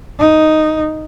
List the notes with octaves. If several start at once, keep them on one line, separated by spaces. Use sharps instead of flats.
D#4